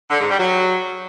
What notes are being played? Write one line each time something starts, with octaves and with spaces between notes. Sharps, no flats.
D3
G#2
G3
F#3